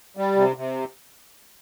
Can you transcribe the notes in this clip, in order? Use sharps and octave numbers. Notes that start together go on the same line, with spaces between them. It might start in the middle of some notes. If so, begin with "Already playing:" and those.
G3
C3
C3